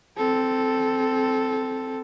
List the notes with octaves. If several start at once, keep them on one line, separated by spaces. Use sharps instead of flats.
C4 A4